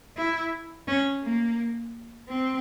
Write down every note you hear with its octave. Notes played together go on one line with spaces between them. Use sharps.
E4
C#4
A#3
C4